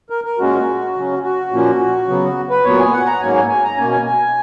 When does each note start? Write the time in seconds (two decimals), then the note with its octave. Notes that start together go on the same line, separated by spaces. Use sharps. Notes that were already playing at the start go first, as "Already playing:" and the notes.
0.10 A#4
0.24 A#4
0.39 A#2 G#3 C#4 F#4
0.95 C#3 F#3 C#4
1.23 F#4
1.52 A#2 F3 A#3 C#4
2.08 C#3 F#3 B3
2.50 B4
2.64 A#2 F#3 B3 C#5
2.79 G#5
2.93 F#5
3.07 A#5
3.21 G#2 F#3 A#3 C#4 G#5
3.35 G#5
3.49 G#5
3.64 A#5
3.77 B2 A#3 C#4 G#5
3.91 G#5
4.05 G#5